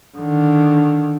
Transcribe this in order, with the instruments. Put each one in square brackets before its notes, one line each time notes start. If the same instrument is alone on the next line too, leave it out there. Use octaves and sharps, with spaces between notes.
[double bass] D3 D#3